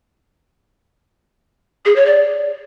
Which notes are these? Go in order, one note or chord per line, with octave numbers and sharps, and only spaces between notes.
G#4
C#5
D5